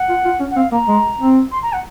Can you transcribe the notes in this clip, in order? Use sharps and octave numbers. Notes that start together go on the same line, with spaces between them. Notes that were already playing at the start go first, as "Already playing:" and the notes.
Already playing: F#5
F4
F4
C#4
F#5
C4 F5
A#3 A#5
G#3
C4
C6
A#5
F#5